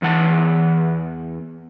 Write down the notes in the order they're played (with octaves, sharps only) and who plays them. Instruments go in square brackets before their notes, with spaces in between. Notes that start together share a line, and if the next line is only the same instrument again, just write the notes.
[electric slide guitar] E2 E3 F#5 A5